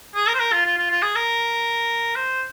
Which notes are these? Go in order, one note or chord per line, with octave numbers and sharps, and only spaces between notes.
G#4
A#4
C5
A#4
F4
F4
F4
F4
G#4
A#4
C5